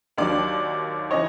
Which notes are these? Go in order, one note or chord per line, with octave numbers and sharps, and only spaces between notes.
D#2 D#3 F#3 D5
C#3 E3 C#5 D#5